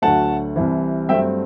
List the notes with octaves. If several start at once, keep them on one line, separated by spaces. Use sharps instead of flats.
D2 D3 F#3 A3 F#5 A5
C2 C3 E3
G2 F#3 A3 C4 E5 G5